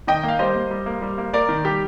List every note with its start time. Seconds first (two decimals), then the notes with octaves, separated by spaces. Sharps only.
0.07 D#3 D#5 G5
0.23 A#3 F5
0.39 G3 C5 D#5
0.55 A#3
0.71 G3
0.86 A#3
1.02 G3
1.18 A#3
1.33 A#3 A#4 D5
1.49 D#3
1.65 G3 G4